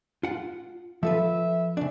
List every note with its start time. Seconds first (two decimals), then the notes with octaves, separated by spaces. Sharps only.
0.23 F4 F#5
1.03 F3 A4 B4 E5
1.77 C#3 D4